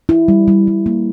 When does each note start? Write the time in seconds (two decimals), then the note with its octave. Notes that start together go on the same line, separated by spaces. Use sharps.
0.09 E4
0.28 G3
0.48 G3
0.67 G3
0.86 A#3